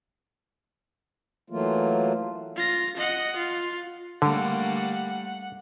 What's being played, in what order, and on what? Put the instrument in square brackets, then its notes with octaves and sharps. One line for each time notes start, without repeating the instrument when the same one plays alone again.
[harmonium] E3 F#3 A3 A#3 F4
[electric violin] F4 A#6
D#5 F#5
F4
[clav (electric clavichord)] D3 [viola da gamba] G3 A3 A#3 [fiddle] F#5